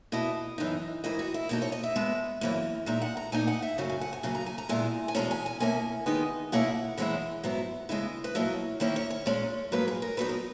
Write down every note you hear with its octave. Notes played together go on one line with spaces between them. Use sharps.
E2 B2 A#3 E4 D#5
F#2 E3 B3 D#4
G#2 E3 A#3 E4 D#5
F#4
E4
B2 A#3 D#4 F#4
C#5
D#5
E5
B2 G#3 B3
F#2 E3 A#3
A#2 G#3 D#4 E5
F#5
A#5
A#2 A#3 D#4 G#5
F#5
E5
F#2 C#3 F#3 C#4 G#5
G#5
F#5
G#5
F#2 C#3 F#3 A#3 G#5
A#5
G#5
A#5
A#2 G#3 B3 E4 G#5
G#5
E2 B2 G#3 C#4 A#5
G#5
G#5
B2 A#3 C#4 E4 G#5
D#3 G#3 B3 D#4
B2 A#3 C#4 E4 F#5
F#2 E3 G#3 C#4 E4
G#2 F#3 B3 E4
C#3 E3 G#3 B3 E4 D#5
B4
B2 F#3 A#3 E4 C#5
D#3 A#3 C#4 E4
C#5
C#5
A#2 G#3 C#4
G#2 F#3 A#3 B4
G#4
A#4
A#2 F#3 B3 D#4 B4
A#4